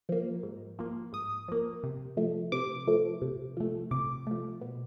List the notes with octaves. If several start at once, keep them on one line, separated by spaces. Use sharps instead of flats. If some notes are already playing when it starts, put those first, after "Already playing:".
F3 A#3
G#2
F3 A#3
G#2 D#6
F3 A#3
C3
F3 A3
C3 D6
F3 A3
C3
F3 A3
C3 D6
F3 A3
B2